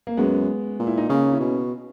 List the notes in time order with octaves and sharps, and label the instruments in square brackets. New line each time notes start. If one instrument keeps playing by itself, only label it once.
[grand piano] A#3
[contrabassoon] F#2 [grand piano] G#3 B3
[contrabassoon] A#2
[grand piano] E4
D#4
[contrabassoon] C#3 [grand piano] A#3 C#4
[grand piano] C#4 E4
[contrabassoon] B2